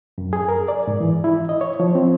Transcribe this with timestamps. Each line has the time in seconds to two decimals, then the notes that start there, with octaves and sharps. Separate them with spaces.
0.18 F#2
0.33 G#4
0.48 A#4
0.68 D5
0.87 G#2
1.01 E3
1.24 E4
1.49 D#5
1.61 C#5
1.80 F3
1.95 C4